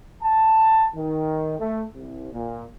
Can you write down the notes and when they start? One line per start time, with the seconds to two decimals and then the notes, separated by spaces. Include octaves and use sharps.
0.22 A5
0.96 D#3
1.59 A3
1.94 C2
2.33 A#2